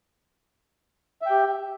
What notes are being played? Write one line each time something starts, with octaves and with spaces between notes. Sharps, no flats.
G4 E5 G5